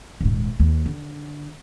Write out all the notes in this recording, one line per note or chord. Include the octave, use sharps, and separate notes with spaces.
D#1 G#2
D#2
D3